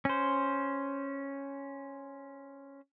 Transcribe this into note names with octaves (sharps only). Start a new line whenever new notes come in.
C#4 C5